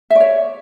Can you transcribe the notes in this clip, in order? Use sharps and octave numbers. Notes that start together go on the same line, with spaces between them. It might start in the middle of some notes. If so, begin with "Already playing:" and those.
C#5 D5 E5